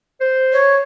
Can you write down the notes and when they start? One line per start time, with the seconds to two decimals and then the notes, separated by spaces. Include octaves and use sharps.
0.21 C5
0.53 C#5